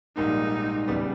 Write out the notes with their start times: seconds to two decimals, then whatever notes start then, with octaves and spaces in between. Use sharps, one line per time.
0.16 A#1 G#2 G3 A#3 D#4
0.88 E2 C#3 G3 B3